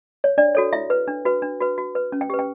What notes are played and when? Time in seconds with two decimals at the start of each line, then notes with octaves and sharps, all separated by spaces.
0.24 C#5
0.38 D4 D5
0.55 F#4 A4 C#5
0.73 E4 E5
0.90 B4
1.08 D4
1.25 F#4 B4
1.42 D4
1.61 F#4 B4
1.78 F#4
1.95 B4
2.12 C#4
2.21 G5
2.30 G4 B4
2.39 G5